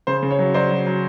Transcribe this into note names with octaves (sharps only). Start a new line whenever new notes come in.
C#3 C5
C#3
C#5
F#3
F#3 C5 D5
F#3
F#3